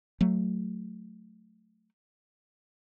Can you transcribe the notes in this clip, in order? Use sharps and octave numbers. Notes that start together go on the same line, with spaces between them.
F#3 A3